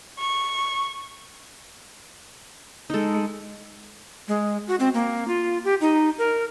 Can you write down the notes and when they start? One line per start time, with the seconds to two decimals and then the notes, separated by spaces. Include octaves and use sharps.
0.19 C#6
2.90 G#3 D#4 A4
4.28 G#3
4.68 F#4
4.80 C4
4.94 A#3
5.28 F4
5.64 G4
5.81 D#4
6.18 A#4